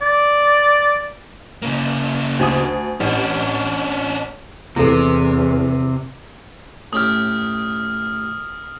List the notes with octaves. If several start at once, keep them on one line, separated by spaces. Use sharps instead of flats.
D5
C#3 A#3
D2 G#5 D#6
A1 C#4 D4
E2 C3 E3 E4 A4
A2 C#4 G4 D#6 F6